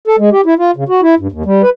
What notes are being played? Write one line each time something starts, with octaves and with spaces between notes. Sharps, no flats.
A4
G#3
G4
E4
F4
C#3
F#4
E4
G2
D#2
G3
B4